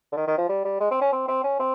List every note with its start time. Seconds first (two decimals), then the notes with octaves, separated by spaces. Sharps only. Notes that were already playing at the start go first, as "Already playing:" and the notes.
0.12 D3
0.17 D#3
0.27 D#3
0.38 F3
0.49 G3
0.65 G3
0.80 G#3
0.91 C4
1.01 C#4
1.12 C4
1.28 C4
1.44 C#4
1.59 C4